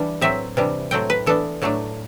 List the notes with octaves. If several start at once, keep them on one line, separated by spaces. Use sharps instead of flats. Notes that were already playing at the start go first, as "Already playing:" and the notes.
Already playing: E3 G3 D4
A2 F#3 C4 E5
C3 E3 G3 D4
A2 F#3 A3 C4 G5
B4
E3 B3 D4 A4
A2 F#3 A3 D4